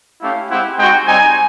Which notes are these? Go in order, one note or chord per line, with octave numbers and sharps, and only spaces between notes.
A3 C#4 E4 G4 F5
G#3 C4 E4 G4 F#5
G#3 C4 D#4 F#4 G5
G3 C4 D#4 G#5